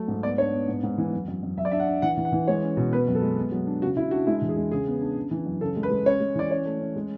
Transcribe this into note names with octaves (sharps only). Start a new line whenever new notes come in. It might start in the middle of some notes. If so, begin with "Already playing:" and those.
Already playing: F#3 A3
G#2
B3 D5
D4 C#5
B3
G#2
G#2
E3
F#2
F#2
F#2
F#2 E5
D5
D4 E5
F#5
D4
E3 F#5
E3
F#5
E3
G#3 C#5
C#4
B2
B3 B4
F#2
A4
G#3
B3
F#3
D4
C#3 F#4
C#3 E4
D4 F#4
G#3 E4
E2
G#4
G#3
C#3 G#4
B3
D4
C#3
E3
F#2
C#3 A4
G#3
B4
G#3
C#4 C#5
G#3
E3 D5
C#4 C#5
A3
C#4
G#3